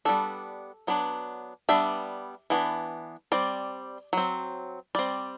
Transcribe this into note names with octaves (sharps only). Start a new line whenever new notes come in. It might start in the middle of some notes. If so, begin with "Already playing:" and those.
G3 B3 D4 A4
F#3 B3 D4
G3 B3 D4 E5
E3 B3 D4
G3 C4 D5
F#3 C4
G3 C4 D5